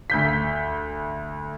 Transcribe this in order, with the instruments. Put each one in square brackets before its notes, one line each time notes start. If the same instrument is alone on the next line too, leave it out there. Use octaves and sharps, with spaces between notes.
[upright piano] D2 G6 B6